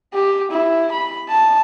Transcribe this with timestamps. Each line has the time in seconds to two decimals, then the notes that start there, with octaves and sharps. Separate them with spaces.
0.14 G4
0.51 E4
0.92 B5
1.29 A5